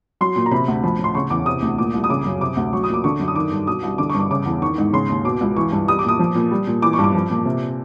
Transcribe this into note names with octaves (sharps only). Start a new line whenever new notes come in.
F#3 C6
A#2
A#5
C3 B5
D2
F3 B5
A2
C6
C#3 C#6
E2 D6
C3 D#6
D2
A#2 D6
C2
D#6
C#3 D6
F#2
C3 D6
D2
F#3 C#6
D#6
A#2 D6
D3 C#6
F#2
D#6
D#3 D6
G2
B2 D#6
C2
D3 D6
C#6
G2
D6
C#3 D6
E2
D#3 C#6
G#2
C#3 C6
D#2
B2 D6
C#2
E3 C#6
G2
G3 D#6
D6
A#2 D#6
F3
A#2
G3
A#2
E3 D6
C#6
G2
D6
F3
A#2
C3